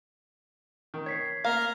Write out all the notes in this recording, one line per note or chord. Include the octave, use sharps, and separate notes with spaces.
D#3
C#5 G#6 B6 C7
A#3 A#4 F5